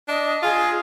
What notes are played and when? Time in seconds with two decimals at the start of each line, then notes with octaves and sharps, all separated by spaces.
0.08 D4 D#5
0.43 F4 G#4